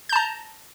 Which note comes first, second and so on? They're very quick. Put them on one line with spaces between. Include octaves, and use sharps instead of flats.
G6 A5 A#5